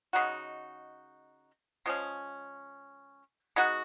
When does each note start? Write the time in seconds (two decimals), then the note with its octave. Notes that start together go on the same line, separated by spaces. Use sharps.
0.13 C#3 G#3 D#4 F#4
1.86 C#3 F3 G#3 C#4
3.56 G#3 B3 D#4 F#4